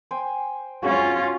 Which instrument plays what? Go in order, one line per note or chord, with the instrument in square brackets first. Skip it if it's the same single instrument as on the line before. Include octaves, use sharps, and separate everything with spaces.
[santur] C5 G5 G#5
[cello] C#4 F4 [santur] F#4 G#4 F5